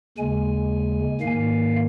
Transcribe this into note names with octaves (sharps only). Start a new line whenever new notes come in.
D#2 C#3 G#3 G#5
G#2 D#3 A#3 F5